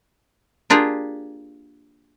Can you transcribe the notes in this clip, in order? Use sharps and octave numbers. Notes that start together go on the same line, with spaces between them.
A#3 D4 F4 G4 G#4